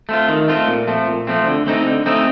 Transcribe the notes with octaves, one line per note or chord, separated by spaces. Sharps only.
A3 C4 F4
D#3
A3 C4 F4
A#2
F3 A3 C4
A#2
F3 A3 C4
D3
A3 C4 D#4
D3
A3 C4 D#4